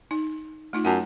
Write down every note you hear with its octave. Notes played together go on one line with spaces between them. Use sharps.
D#4
A3 D#4 F4
F#2 F#5 A5